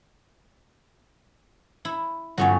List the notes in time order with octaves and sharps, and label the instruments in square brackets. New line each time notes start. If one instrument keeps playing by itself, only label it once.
[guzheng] E4
[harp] G1 [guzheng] G3 C#4 F#4